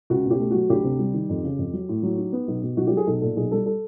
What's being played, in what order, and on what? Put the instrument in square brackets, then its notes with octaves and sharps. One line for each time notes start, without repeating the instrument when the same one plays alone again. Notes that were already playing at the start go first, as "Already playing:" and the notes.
[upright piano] C#2 F#4
B2
G4
A3
F#3 F#4
D2 G4
C3
G3
D#3
F2
C#3
F2
F#3
A2
F#3
D#4
B3
B1
B2
B1 F#4
F#3 G4
G#4
B1 A4
A#2 A4
B1 G#4
G3 A4
A4